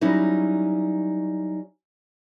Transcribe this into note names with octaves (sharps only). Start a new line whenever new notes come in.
F#3 G3 C#4 D#4 E4